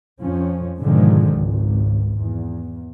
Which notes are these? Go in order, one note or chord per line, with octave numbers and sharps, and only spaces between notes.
F2 F3 C#4
G#2 B2 D3 D#3 F3 G#3
G#1 C#2
E2